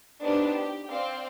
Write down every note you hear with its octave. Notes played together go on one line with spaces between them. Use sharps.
B3 C4 D4 D#4 G4 B4
G4
C4 D5 F5 G5